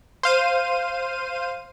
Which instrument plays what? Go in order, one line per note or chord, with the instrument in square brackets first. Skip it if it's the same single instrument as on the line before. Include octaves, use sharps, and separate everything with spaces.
[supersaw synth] C5 F5 D#7